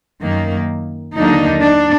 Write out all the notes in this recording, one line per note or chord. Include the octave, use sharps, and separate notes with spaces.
F#2 D#3 A#3
D#2 D3 F#3 A#3 D4 D#4
D4